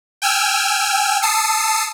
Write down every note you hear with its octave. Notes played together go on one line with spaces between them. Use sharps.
G5 G#5 E6 F6
A5 D#6 E6 C7 C#7